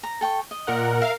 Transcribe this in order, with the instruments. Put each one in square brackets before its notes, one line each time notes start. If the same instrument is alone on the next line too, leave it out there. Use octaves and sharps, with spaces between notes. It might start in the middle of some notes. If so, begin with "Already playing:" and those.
[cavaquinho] A#5
A4 G5 C#6
D#5
[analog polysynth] A#2 A#4 F#5
[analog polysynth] A#4 F5 [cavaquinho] E5